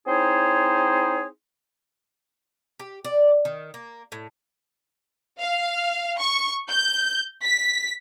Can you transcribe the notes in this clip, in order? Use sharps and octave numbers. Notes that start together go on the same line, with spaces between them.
C4 D#4 E4 G#4 C5 C#5
G4
D5
D#3
A#3
A2
F5
C#6
G6
B6